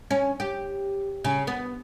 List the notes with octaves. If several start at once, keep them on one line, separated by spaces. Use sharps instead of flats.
C#4
G4
C#3
B3